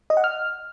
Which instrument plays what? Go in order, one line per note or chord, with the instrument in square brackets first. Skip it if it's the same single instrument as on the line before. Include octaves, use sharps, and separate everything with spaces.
[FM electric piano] D#5
F#5
F6